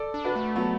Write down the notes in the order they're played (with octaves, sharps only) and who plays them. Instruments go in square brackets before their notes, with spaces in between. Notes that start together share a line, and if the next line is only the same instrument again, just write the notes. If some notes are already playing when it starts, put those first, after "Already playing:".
Already playing: [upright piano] A4 D5
[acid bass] D4
[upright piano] F#4 B4
[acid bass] A3
[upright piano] F#3 B3